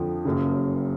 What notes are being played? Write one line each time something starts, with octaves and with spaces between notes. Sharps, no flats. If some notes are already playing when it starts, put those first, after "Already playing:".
Already playing: F2 D3 F3
F#1 F#2 C#3